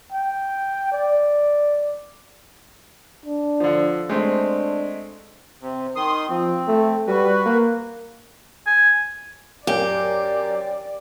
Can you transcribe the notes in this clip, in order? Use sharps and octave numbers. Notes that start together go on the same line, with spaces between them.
G5
D5
D4
D3 F3
G#3 A3 C4 D4
C3
D#3 C6 D#6
F3 C4
A3
G3 F#4 B4
A#3
G#5
F#2 G4 A#4 D5 G#5